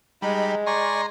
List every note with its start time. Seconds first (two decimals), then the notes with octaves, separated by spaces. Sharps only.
0.22 G3 G#3 D#4 B5
0.67 D5 G#5 A#5 C6 C#6